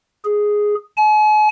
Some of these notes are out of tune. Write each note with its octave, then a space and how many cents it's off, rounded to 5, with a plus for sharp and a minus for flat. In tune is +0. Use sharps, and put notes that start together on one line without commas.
G#4 +0
G#5 +45